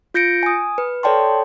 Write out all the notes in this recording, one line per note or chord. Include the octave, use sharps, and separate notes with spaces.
F4 G6 A#6 C#7 D7
G#5 D#6
B4
A4 C#5 D5 G5 A5 C6